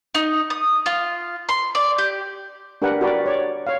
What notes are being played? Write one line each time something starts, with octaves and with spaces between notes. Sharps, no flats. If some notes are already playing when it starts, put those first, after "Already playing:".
D#4
D#6
F4
C6
D5
G4
D4 G4 A#4 B4 F#5
F#4 G4 A#4 B4 D5
C#5 D5
C#5 F5